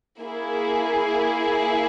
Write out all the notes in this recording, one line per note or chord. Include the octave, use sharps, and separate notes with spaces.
A#3 E4 G#4